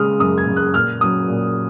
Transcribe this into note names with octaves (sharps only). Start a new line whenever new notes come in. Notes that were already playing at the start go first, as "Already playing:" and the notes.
Already playing: C#3 G#3 D#6 F6
F#2 D#6
G#6
C#3 G#3
F#6
A#2 F6
F#3 C#4 D#6
A#2